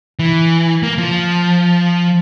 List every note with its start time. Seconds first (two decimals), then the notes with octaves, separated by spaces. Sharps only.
0.19 E3
0.83 A#3
0.98 F3